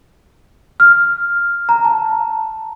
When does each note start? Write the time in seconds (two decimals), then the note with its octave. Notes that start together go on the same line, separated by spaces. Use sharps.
0.80 F6
1.69 A#5
1.85 A5